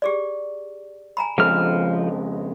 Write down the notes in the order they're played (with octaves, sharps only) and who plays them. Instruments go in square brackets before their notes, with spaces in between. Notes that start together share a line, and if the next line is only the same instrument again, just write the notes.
[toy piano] G4 G#4 D5
G#5 A#5 B5
[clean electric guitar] F2 C#3 G#3 [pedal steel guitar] F3 F6